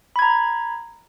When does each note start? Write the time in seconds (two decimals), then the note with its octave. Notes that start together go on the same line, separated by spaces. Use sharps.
0.16 B5
0.19 G#6
0.22 A#5